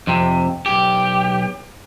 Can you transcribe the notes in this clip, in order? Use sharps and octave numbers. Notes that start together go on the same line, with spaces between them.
F2 C3
B1 G4